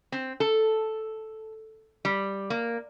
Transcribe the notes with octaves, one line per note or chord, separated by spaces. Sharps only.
C4
A4
G3
A#3